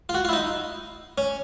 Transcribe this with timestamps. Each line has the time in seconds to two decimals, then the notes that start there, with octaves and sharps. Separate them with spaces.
0.09 F4
0.14 F#4
0.25 F4
0.29 E4
0.33 D#4
1.18 C#4